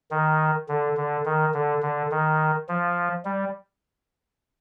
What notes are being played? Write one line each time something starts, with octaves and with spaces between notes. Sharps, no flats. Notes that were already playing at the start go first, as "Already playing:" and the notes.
D#3
D3
D3
D#3
D3
D3
D#3
F3
G3